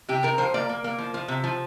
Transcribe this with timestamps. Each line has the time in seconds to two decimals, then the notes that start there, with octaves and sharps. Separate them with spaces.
0.09 C3 G4
0.23 C3 A#4
0.38 F3 C5
0.54 A#3 D5
0.69 A#3
0.84 A#3
0.98 F3
1.14 F3
1.28 C3
1.44 F3